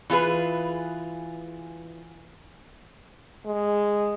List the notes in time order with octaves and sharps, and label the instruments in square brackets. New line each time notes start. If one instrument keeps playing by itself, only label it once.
[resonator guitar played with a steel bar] E3 F4 G#4 B4
[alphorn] G#3